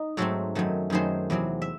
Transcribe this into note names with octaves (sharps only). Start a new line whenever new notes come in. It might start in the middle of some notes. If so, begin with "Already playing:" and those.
Already playing: D#4
G#2 F#3 A3 C4 F#4 A4
F#2 D#3 F#3 A3
F#2 D#3 F#3 A3 G#4 C5
E2 C3 F#3 C4
E5